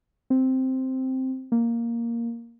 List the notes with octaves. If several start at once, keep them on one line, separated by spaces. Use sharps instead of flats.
C4
A#3